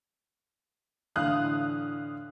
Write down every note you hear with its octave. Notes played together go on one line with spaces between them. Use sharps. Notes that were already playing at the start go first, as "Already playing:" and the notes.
A2 D3 E3 F5 D#6 F#6